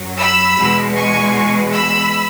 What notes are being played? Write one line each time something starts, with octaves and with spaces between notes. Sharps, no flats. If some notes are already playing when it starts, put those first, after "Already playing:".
Already playing: F#2 F#3
B5 E6
E2 B2 G#3
G#5 C#6
B5 E6